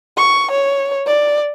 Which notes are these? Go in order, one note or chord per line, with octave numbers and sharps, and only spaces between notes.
C#6
C#5
D5